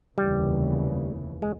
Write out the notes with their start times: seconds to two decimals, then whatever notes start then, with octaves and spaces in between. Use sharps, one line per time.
0.17 F1 D#2 C#3 E3 G3
1.42 G#3